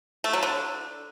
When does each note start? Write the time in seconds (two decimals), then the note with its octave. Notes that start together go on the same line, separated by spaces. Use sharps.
0.24 A3
0.33 F#3
0.43 D3